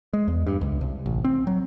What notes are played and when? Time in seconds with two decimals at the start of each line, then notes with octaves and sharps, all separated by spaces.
0.13 G#3
0.28 E2
0.47 G2
0.61 C#2
0.81 C2
1.06 A1
1.24 C4
1.47 F#3